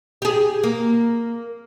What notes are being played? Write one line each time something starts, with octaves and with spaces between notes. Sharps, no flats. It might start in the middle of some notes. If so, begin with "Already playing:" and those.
G4 G#4
A#3